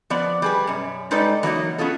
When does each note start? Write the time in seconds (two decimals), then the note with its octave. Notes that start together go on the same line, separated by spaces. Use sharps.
0.10 F3 B3 D5
0.42 G3 G#4 B4
0.67 F#2 B2
1.11 G3 G#3 D#4 A4 B4 D5
1.43 E3 F#3 A#3 D#4
1.78 B3 C#4 F4 G#4 A4